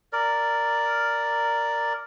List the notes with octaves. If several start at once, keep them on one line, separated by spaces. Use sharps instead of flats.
A#4 D5